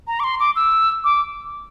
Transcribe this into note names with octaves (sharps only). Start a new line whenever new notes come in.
A#5
D6
C6
D6
E6
D6